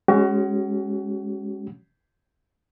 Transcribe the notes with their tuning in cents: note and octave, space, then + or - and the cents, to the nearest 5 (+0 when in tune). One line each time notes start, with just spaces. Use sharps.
G#3 +0 C#4 +0 F#4 +35